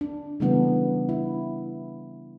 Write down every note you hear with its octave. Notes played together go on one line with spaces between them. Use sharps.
D4
C#3 E3 G3 A3 B3 D4
E4